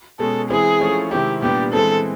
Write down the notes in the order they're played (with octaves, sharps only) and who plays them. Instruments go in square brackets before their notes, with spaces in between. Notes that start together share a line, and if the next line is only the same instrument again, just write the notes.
[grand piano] B2 G#3 C#4 [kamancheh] A4
[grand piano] E3 G#3 C4 E4 [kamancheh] G#4
[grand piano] F3 A3 C#4 E4
[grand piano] C3 D#3 G#3 C4 E4 [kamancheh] G4
[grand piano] A#2 G3 B3 D4 [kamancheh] G4
[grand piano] E3 G#3 C4 [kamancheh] A4